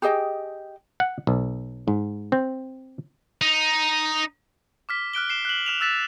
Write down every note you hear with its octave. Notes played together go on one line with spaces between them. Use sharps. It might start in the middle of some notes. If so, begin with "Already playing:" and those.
G4 G#4 D#5 G5
F#5
B1
G#2
C4
D#4
D6 F6 B6
F6 F#6 D7 G7
C7 E7
F#6 F#7
F6 E7 F7
E6 F#6 A6 B6 E7